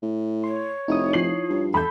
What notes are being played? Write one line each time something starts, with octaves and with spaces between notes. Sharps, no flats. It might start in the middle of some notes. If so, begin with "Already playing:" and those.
A2
C#5 C6
F1 D#4 E4 D#6
F3 C7 F#7
G2
E2 A4 B5 G6